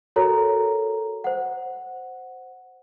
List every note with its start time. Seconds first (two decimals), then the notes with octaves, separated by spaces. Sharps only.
0.16 F#4 A4 A#4 C#5 A#5
1.24 C5 F#5